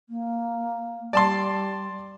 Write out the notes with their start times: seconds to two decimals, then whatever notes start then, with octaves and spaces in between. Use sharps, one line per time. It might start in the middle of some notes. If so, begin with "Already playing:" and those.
0.09 A#3
1.13 G3 D5 A5 C6